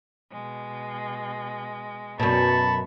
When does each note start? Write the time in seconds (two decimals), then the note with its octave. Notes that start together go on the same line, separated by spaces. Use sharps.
0.32 B2 G#3
2.20 F#2 B2 A5 B5 C#6